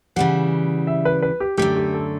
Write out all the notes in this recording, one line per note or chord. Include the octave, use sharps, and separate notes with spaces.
C#3 E3 G3 F#5
E5
B4
B4
G4
F#2 D3 A3 G4
G4
A4